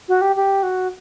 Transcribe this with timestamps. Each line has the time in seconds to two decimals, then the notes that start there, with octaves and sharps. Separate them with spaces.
0.08 F#4
0.22 G4
0.36 G4
0.63 F#4